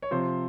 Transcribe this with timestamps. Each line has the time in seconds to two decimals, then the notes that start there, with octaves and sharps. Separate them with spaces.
0.02 C#5
0.11 C3 F3 C4 C5